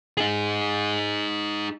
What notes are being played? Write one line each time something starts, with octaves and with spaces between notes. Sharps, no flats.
D#4 G#4